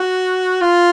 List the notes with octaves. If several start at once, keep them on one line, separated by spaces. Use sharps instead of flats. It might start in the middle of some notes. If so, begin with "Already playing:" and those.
Already playing: F#4
F4